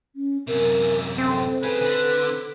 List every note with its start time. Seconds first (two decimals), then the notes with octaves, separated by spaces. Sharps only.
0.16 C#4
0.47 F#2 C3 A#4
1.18 C4 A4
1.63 C#3 G#4 B4
1.81 D3